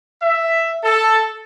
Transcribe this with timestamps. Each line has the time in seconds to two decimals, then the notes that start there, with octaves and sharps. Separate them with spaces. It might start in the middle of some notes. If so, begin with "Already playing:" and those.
0.22 E5
0.83 A4